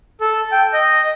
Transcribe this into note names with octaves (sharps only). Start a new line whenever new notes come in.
A4
G5
D#5